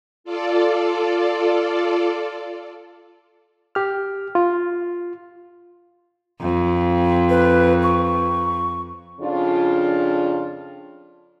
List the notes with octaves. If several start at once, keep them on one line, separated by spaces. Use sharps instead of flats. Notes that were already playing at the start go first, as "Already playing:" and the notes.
F4 A4 D5
G4 F6
F4
F2
B4
C#6
F2 C#3 D4 F4